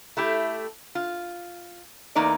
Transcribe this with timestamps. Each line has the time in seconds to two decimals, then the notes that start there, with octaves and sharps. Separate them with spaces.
0.17 A3 E4 G4
0.95 F4
2.15 E2 A#3 D#4 D5